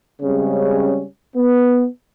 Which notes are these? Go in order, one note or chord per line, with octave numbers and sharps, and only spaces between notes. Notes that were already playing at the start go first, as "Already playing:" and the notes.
C#3 G3 G#3 C4 C#4
B3